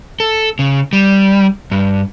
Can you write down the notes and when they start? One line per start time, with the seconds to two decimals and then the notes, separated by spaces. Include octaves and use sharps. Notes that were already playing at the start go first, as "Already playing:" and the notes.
0.20 A4
0.59 C#3
0.93 G3
1.71 G2